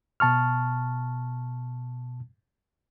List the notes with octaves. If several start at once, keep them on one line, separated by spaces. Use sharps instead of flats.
B2 A5 C#6 F6